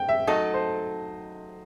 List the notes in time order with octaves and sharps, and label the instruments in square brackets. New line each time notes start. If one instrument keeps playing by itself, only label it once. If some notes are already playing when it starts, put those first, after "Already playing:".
Already playing: [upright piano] G5
E5
[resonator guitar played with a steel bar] F#3 A3 D#4 A4 [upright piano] D#5
[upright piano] C5